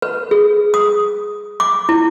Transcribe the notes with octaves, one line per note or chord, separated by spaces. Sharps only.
B4
G#4
D#6
D6
E4